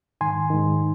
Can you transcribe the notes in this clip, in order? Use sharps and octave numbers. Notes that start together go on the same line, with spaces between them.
G#2 D#3 G#5 C6
G#2 D#3